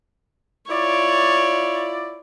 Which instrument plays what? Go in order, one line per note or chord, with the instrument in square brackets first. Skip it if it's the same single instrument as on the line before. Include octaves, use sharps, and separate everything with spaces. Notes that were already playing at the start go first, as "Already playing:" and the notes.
[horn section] E4 F4 D5 [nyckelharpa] C#5